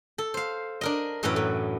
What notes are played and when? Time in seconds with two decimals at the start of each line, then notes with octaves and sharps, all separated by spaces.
0.18 A4
0.34 C5 F5
0.81 D4 A#4 D#5
1.23 F#2 A2 E3 A4 B4 A#5
1.36 A2